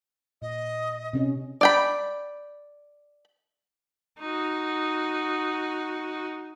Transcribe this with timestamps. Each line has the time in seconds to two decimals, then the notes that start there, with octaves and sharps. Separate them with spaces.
0.42 A#2 D#5
1.13 C3 C#4 D#5
1.61 D5 G5 B5
4.20 D#4 F#4